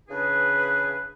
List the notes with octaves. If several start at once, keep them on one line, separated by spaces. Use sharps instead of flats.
C#3 E3 D4 G#4 B4